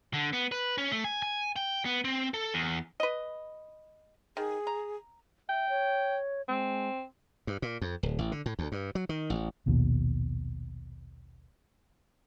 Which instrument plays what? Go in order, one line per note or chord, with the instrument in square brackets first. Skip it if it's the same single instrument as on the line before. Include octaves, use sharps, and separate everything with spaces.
[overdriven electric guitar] D3
B3
B4
C#4
A3
G#5
G#5
G5
B3
C4
A4
E2
[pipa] B4 D#5
[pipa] D#3 [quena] G#4
[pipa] A#5
[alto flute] E5 [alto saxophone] G5
[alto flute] C#5
[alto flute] G#3 [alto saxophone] C4
[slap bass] G2
A#2
F2
D1
A1
D3
A2
D2
G2
F#3
D#3
A1
[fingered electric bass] A#1 D#2 B2